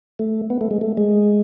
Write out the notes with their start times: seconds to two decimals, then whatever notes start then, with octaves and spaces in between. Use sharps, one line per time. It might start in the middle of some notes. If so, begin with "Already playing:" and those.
0.19 A3
0.50 B3
0.61 A3
0.71 G#3
0.81 A3
0.97 G#3